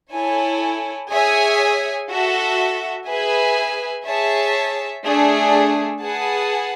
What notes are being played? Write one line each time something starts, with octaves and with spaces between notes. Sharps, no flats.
E4 A4 C#5 G#5
G#4 C#5 E5 G#5
F#4 A4 E5
G#4 B4 E5 G#5
G#4 C#5 E5 A5
A3 D4 G#4
G#4 B4 F#5 A5